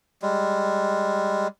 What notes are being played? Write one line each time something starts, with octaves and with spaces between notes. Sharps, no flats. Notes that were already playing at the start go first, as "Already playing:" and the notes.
G3 G#3